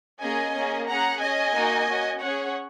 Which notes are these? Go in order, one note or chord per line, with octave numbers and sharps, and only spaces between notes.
A#3 C#4 G#4 D#5 G#5
A#3 C#4 G#4
C#4 G#4 F#5 A#5
C#4 G#4 D#5 G#5
A#3 D#4 F#4
C#4 F#4
C#4 G#4 C#5 F#5